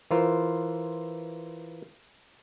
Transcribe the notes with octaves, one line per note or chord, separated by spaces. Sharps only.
E3 F4 A#4 C5